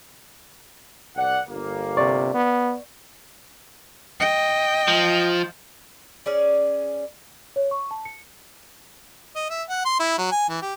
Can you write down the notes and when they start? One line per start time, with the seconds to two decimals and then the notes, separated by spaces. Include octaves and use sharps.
1.16 C2 D5 F#5
1.47 G1 A#3
1.97 C3 D5 C#6
2.34 B3
4.20 D#5 G5
4.88 F3
6.26 C#4 G#4 D5
7.56 C#5
7.71 C#6
7.91 A5
8.05 C#7
9.36 D#5
9.50 E5
9.70 F#5
9.85 C6
10.00 E4
10.18 F#3
10.31 G#5
10.49 E3
10.62 G4